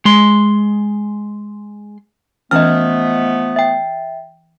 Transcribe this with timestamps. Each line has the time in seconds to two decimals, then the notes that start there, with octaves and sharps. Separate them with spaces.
0.05 G#3 C6
2.51 E3 F3 A3 B3 C#4 D#5 F6
3.56 E5 G5